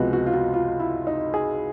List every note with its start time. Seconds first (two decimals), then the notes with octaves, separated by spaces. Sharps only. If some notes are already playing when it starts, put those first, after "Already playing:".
Already playing: C#2 C3 F3 G#3 B3 F#4
0.13 F#4
0.26 F4
0.33 F#4
0.54 F4
0.79 E4
1.07 D#4
1.34 G#4